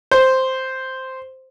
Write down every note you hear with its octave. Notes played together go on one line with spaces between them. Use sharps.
C5